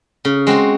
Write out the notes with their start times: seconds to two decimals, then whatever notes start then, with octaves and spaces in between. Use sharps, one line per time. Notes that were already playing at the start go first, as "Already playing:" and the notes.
0.25 C#3
0.47 G#3 C4 F#4 C5